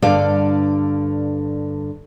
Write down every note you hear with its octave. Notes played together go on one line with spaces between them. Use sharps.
G2 D3 A4 D5 F5